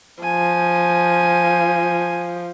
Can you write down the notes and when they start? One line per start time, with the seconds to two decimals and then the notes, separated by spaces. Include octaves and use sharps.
0.23 F3 G#5